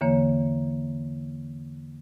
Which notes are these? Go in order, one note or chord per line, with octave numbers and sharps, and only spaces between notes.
E2 D3 E3 A#3 C#5